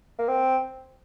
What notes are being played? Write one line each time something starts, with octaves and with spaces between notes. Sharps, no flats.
A#3
C4